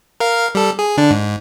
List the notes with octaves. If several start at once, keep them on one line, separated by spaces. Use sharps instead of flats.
A#4 F5
G3 A4
G#4
D3 D4
G#2